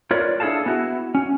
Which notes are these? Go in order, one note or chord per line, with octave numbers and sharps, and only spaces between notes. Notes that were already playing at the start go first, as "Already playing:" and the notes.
F4 A#4 B4 C#5 D5
D4 E4 G#4 A4 F5 A5
B3 E4 F#4
C#4